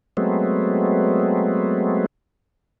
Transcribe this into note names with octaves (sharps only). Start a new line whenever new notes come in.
F#3 G#3 A3 B3 C4